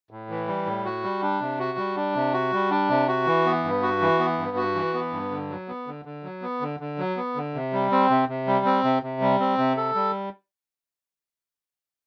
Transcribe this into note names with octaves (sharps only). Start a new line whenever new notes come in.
A2
E3
G3
A2
F#4
G3
D4
C3
F#4
G3
D4
C3
F#4
G3
D4
C3
F#4
E3
B3
G2
F#4
E3
B3
G2
F#4
E3
B3
G2
D3
F#3
B3
D3
D3
F#3
B3
D3
D3
F#3
B3
D3
C3
G3
C4
C3
C3
G3
C4
C3
C3
G3
C4
C3
A4
G3